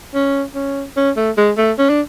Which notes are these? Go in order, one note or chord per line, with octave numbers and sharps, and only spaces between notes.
C#4
C#4
C#4
A3
G#3
A3
C#4
D4